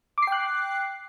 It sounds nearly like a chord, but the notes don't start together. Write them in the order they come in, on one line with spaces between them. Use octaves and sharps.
D6 C7 G5 F#6